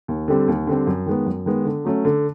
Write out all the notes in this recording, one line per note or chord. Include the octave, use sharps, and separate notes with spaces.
D#2
D3 G3 C4
D#2
D3 G3 C4
F#2
D#3 G#3 B3
F#2
D#3 G#3 B3
D3
F#3 A3 C#4
D3